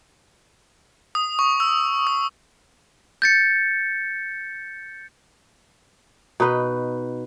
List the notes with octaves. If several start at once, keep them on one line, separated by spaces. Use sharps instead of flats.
D#6
C#6
E6
D#6
G6 A6 C#7
B2 D#4 B4 D#5